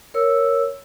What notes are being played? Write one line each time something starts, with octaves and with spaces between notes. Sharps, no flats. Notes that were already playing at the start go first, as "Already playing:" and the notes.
A#4 C#5 E6